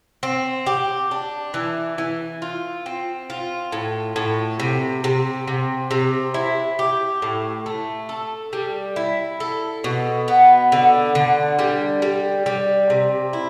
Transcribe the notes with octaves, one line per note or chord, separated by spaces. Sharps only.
C4
G4
D4
E3
E3
F4
C4
F4
A2
A2
C3
C3
C3
C3
E4
G4
A2
A3
A4
G3
E4
A4
B2
B3
D3
D3
G3
G3
G3
C3
E4